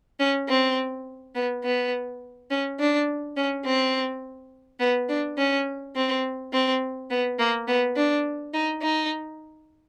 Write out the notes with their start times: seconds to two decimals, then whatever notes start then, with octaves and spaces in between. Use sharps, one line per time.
0.20 C#4
0.48 C4
1.35 B3
1.64 B3
2.51 C#4
2.80 D4
3.37 C#4
3.65 C4
4.80 B3
5.09 D4
5.38 C#4
5.96 C4
6.53 C4
7.10 B3
7.39 A#3
7.68 B3
7.96 D4
8.54 D#4
8.82 D#4